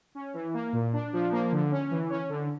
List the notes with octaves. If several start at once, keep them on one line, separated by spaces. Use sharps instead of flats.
C#4
E3
A#3
A#2
D4
F3
A#3
D3
C#4
E3
C#4
D3